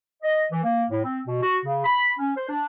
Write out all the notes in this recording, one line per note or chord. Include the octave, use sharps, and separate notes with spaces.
D#5
E3
A#3
A2
C4
B2
F#4
C#3
B5
C#4
C5
D4